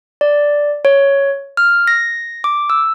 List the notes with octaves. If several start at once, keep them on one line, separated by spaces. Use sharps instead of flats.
D5
C#5
F6
A#6
D6
E6